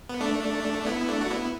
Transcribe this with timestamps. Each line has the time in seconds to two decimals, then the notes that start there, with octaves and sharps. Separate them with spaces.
0.09 B3
0.21 A3 D4
0.80 D4
0.86 B3 E4
1.08 A3 D4
1.21 F#4
1.30 B3 E4